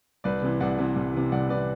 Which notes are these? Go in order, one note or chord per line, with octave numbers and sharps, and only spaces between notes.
C2 B4 D5
C3 E3
C2 D5 F#5
C3 E3
C2
C3 E3
C2 D5 F#5
C3 E3 B4 D5